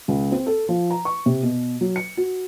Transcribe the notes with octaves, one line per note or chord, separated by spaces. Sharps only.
C#2
C4
A4
F3
A#5
C#6
C3
B2
F#3
C#7
F#4